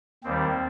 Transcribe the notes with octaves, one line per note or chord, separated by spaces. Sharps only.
D#2 D#3 G3 C4